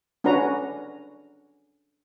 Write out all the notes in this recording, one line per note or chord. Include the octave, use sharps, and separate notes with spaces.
C#4 D4 F#4 B4 A#5